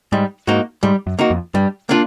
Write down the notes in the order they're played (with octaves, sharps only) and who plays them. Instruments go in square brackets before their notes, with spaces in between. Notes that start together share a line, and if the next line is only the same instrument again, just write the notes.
[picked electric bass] G#2 [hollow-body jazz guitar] G3
[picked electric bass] G#2 [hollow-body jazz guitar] A#3 D#4 F#4
[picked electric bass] G#2 [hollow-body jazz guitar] G3
[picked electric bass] F#2
[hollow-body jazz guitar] A#3 D#4 F#4
[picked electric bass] F2
[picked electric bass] G2 [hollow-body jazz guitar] G3
[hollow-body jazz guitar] A#3 D4 F4